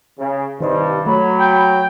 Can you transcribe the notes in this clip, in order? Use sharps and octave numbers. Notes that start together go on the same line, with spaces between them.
C#3
C2 G2 D#3 C5 D#5
F#3 A3 B5
G5